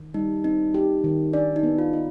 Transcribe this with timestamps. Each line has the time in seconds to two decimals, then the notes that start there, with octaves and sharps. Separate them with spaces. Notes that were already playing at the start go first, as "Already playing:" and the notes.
Already playing: D#3
0.14 G3 D#4
0.44 C4 D#4
0.74 G4
1.04 D#3
1.33 D4 D5
1.56 D#4
1.63 B3
1.78 F4
1.93 D#4